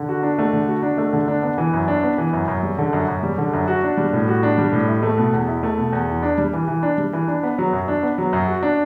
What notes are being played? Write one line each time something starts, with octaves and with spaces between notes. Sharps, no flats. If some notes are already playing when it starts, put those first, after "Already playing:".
Already playing: D3
F#4
D4
A3
D3
F#4
D4
A3
D3
D4
B3
E3
F#2
D4
B3
E3
F#2
F#2
G3
D3
F#2
F#2
G3
D3
F#2
F#4
D4
G3
A2
F#4
D4
G3
A2
E4
A3
B2
E2
E4
A3
B2
E2
E3
D4
G3
E3
E3
D4
G3
E3
D4
B3
F#3
F#2
D4
B3
F#3
F#2
F#4
D4